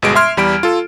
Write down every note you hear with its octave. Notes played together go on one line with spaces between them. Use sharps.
G1 B2 G#3 D7
E5 C6 F6 G#6
E2 G3 B5 D7
F4 A4